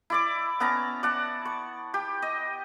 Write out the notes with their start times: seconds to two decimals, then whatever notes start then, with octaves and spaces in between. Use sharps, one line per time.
0.10 E4 D5 D6
0.60 B3 C#4 A5 A#5
1.03 D5 F#5 A5
1.45 C#6
1.94 G4
2.22 D#5